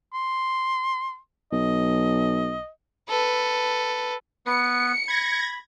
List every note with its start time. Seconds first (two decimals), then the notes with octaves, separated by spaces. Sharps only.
0.13 C6
1.52 B1 D#5
3.09 A4 B4
4.46 B3 B4 C#7
5.08 B5 G#6 A#6